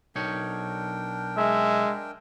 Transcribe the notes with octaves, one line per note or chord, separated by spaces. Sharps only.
B1 D4 D#4 A#4 C#5 G5
G#3 E5